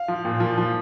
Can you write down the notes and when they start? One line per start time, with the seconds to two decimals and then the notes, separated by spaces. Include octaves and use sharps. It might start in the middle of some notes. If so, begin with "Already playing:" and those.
Already playing: F5
0.08 F3
0.25 A#2
0.40 F3
0.58 F3